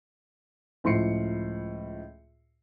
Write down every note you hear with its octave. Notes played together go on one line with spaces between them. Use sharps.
C#2 A2 F3 C6 C7 C#7